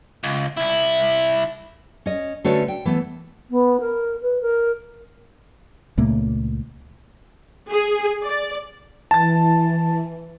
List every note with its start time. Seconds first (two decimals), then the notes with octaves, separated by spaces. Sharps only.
0.24 C#2
0.57 C2 E4
2.06 C#4 D#5
2.44 D3 A3 C#4 F#4 B4 C#5
2.68 G5
2.85 E3 A3 B3
3.51 B3
3.81 A#4
4.22 B4
4.42 A#4
5.97 C#2 A#2 A3 A#3
7.70 G#4
8.23 D5
9.11 E3 A5 A6